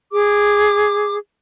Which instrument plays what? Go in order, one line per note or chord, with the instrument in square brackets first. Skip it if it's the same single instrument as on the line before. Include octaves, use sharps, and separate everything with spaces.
[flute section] G#4 D6